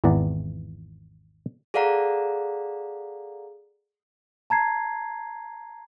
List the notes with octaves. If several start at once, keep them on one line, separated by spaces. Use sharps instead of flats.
G#1 E2 E3 D5 F#5 A#5
G#4 A4 D5 F5 F#5 A#5
A5 A#5 G#6 C7